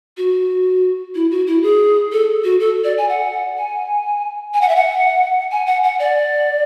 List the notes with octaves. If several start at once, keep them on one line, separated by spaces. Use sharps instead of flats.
F#4
E4
F#4
E4
G#4
A4
F#4
A4
D5
G#5
F#5
G#5
G#5
F#5
E5
F#5
G#5
F#5
F#5
D5